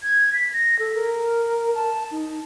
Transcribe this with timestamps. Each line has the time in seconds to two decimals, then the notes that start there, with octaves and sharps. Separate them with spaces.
0.03 G#6
0.33 B6
0.53 A#6
0.79 A4
0.95 A#4
1.75 A5
2.12 D#4